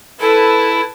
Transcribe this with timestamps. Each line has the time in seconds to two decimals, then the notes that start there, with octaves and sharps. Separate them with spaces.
0.20 E4 A4 B4 A5